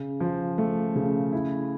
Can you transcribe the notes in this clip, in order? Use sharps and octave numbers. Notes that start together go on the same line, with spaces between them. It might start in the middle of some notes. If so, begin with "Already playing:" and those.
Already playing: C#3
F3
A3
C#3
E4